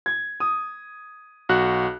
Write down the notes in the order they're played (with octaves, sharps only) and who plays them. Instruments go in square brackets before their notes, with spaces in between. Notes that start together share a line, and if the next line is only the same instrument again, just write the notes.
[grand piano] G#6
D#6
[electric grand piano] B1 F#4 F#6